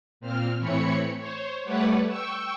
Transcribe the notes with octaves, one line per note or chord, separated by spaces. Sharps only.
A#2 C4 F6
A2 E3 C4 C#5 B5 C#7
C5 C#5
G3 A3 B4 C#5 D5 F#5
G5 C#6 E6